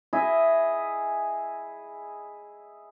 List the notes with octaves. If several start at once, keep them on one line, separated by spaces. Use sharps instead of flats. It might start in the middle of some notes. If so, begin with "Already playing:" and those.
E4 G#4 D#5 E5